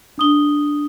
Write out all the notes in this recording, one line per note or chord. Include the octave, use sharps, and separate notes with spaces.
D4 D#6 G7